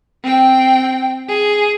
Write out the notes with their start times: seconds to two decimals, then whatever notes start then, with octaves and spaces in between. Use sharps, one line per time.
0.23 C4 G5
1.29 G#4